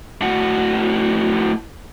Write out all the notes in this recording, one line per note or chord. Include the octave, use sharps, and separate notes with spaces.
A2 F#4